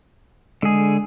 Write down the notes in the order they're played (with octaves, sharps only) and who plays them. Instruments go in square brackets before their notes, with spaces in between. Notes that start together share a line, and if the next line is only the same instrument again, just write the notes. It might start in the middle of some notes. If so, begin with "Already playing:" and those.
[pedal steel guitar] D3 G#4 [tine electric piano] G#3